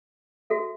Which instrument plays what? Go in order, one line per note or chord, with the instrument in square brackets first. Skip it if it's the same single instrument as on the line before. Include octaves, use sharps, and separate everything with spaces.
[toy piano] F#4 A4 E5